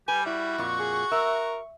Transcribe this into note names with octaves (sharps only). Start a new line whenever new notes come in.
G3 G4 B4 G#5
E4 F#4 D5
F2 A#2 C#6
G#4
A#4 E5